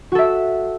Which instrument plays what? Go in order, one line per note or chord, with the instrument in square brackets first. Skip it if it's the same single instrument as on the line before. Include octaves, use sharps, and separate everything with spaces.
[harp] F#4
A4
E5